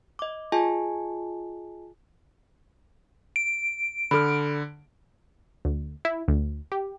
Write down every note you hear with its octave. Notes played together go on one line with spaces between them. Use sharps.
D#5 D6
F4 G#4 D#5 G#5 A5
D7
D3 A4 B5 F6
D2
E4
D2
G4